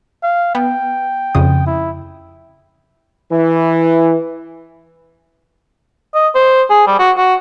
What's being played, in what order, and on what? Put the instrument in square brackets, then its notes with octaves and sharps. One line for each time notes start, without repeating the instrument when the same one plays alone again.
[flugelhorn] F5
[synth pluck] B3 [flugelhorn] G5
[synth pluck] F2 C#3 D#6
[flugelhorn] E4
[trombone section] E3
[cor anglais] D#5
C5
G#4
G3
F#4
F#4